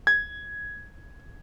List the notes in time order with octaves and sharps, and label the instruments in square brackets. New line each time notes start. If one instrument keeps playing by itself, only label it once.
[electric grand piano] G#6